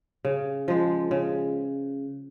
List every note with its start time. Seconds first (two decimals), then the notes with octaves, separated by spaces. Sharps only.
0.25 C#3
0.68 F3 G#3
1.11 C#3